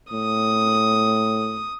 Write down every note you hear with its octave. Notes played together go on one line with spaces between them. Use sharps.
A2 D#6